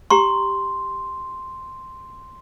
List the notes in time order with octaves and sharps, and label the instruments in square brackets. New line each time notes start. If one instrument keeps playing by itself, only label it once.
[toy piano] G4 A#5 C#6 [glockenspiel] C6